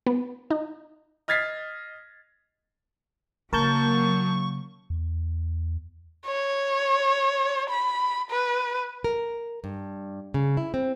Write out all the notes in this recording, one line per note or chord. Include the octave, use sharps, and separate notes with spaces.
B3
D#4
D#5 F6 G#6 A6 B6 C7
C#3 F#3 A#3 A#4 A5 C#6 G6
E2
C#5
B5
B4
A#4
G2
C#3
E4
C4